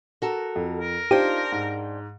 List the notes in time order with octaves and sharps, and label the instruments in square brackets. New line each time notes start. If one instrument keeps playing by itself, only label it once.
[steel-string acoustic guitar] F#4 A4 A#4
[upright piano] F2
[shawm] A#4
[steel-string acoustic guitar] D4 C5 G5 [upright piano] D#4 F4 [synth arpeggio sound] G4
[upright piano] G#2